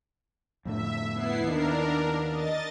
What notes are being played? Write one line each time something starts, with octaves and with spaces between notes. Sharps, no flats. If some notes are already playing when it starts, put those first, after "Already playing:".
F2 A2 D3 E5
B3 E4 C7
D#2 D#3 D4 A#4
D#5 A6